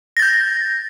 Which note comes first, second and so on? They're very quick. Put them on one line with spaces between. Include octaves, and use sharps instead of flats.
A#6 A6 G6